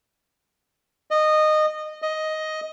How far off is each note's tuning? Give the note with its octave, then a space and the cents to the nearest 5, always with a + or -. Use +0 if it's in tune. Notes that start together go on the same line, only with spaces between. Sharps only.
D#5 -15
D#5 +10